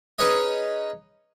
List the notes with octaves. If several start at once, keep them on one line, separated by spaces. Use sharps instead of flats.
C#4 D#4 G#4 B4 C#5 D#5